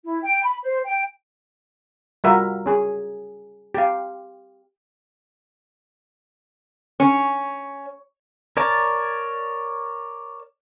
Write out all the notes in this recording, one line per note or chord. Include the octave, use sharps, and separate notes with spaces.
E4
G5
B5
C5
G5
G3 F4 F#4 A#4 E5 F#5
C#4 G#4
G4 F5
C#4
A#4 C#5 D5 A5